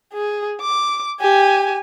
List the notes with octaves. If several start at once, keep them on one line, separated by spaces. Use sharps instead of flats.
G#4
D6
G4 G#5